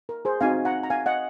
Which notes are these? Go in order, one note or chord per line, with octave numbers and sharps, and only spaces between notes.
A#4
G#4 C5
C4 D#4 F#4 F5 G#5
F#5 A#5
A#5
F5 G#5
D#5 F#5